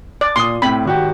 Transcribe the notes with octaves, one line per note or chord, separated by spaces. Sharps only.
D5
A#2 C6 D#6
A2 C4 B5
G#1 F#4 G4